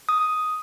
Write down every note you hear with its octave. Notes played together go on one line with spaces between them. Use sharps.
D#6